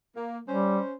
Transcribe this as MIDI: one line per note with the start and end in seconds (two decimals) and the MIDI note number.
0.16 0.39 58
0.48 0.79 55
0.48 0.94 61
0.48 0.94 72